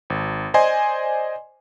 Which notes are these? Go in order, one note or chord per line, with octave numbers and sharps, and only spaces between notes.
G#1
C5 D5 D#5 G#5 C6